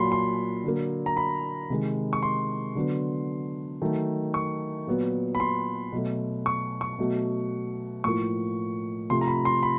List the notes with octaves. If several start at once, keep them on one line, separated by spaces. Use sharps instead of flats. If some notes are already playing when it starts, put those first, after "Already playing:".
Already playing: A#2 F#3 A#3 B5 C6
C6
D3 F#3 A#3
A#5
B5
C3 D#3 G#3
C#6
C6
D3 F#3 B3
D#3 F#3 A3
C#6
A#2 F#3 B3
B5
C6
B2 F#3 A3
C#6
C#6
B2 F#3 A3
A2 F3 A#3 C#6
C3 F3 A3 C6
A#5
B5
C6
B5